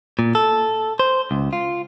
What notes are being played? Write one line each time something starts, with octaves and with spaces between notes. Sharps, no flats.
A#2
A4
C5
C#2
F4